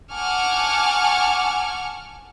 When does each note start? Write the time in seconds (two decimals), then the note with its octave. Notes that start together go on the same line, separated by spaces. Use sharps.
0.13 F#5 G#5 A5 C#6 D6 F6